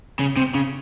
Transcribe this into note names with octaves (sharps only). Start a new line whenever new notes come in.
C#3
C3
C#3